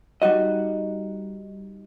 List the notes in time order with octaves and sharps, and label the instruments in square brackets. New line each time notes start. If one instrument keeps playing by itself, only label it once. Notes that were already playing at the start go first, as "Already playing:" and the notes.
[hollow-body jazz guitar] G3 D#4 F#4 D#5